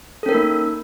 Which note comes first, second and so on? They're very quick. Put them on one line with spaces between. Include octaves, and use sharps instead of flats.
A4 C#4 A#4 D#4 A#3